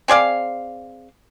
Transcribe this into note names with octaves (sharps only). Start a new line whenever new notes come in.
C4 G#4 D5 F5